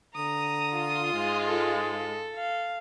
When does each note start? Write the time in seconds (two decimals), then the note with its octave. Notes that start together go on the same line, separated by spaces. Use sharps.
0.16 D3 A#5 D#6
0.72 F4
1.14 G#2 G#3
1.47 A4
2.35 F5